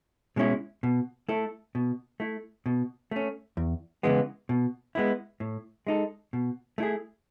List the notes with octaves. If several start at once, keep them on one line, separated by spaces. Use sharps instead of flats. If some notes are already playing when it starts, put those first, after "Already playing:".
B2 G#3 C#4 E4
B2
A3 E4 A4
B2
A3 E4
B2
A3 C#4
E2
C#3 E3 G#3 B3
B2
G#3 B3 E4
A2
G#3 D#4 A4
B2
A3 E4 G#4